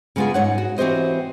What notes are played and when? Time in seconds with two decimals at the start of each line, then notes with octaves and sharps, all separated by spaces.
0.16 C#3 G#3 B3 F4 G#4
0.34 G#2 C#5 F#5
0.58 F#4
0.78 E3 C4 F#4 G4 C5 D#5